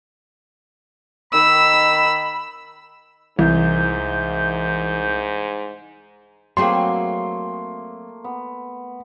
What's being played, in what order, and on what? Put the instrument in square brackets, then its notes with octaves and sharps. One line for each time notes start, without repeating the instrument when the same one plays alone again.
[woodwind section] D#3 B5 [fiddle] E6
[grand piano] C2 [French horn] G#2 [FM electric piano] E3 [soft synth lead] G6
[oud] F#3 C4 G#4 [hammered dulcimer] A3 A#3 [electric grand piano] C6
[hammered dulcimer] B3